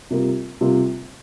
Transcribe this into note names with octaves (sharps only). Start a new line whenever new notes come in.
C3 G3 A#3 F4 A#4
C3 G3 A#3 F4 A#4